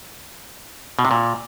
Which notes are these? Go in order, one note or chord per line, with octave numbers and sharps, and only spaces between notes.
B2
C3
A#2